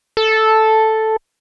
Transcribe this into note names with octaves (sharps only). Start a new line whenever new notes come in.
A4